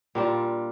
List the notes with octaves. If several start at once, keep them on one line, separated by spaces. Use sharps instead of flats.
A#2 G3 D4 F4